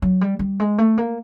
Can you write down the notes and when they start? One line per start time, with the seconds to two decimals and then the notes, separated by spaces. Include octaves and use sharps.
0.02 F#3
0.21 G3
0.39 G3
0.60 G#3
0.78 A3
0.98 A#3